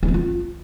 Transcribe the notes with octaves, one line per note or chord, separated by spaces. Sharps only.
E4
C4
F4